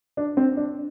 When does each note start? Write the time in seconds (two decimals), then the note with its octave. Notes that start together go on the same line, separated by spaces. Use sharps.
0.17 D4
0.37 C4
0.57 D4